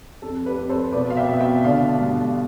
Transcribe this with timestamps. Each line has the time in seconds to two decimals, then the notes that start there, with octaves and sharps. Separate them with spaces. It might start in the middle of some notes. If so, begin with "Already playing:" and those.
0.22 F2 A4
0.46 G4 B4
0.57 F2
0.69 A4 C5
0.93 B2 B4 D5
1.10 F5
1.16 E5 G5
1.29 B2
1.40 E5 G5
1.64 D3 D5 F5
2.00 G2